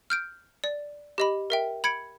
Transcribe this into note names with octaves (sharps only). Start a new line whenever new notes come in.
F6 G6 D7
D5
G4 D#5 B5
A#4 E5 G5
B5 G#6 C#7 D7